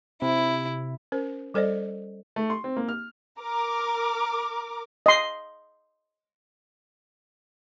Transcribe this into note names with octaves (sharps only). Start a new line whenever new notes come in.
C3 E4
C#4 A#4 C5
G3 A4 C5 D5 D#5
A3
C6
C4
A#3
F6
A#4 D6
D#5 C6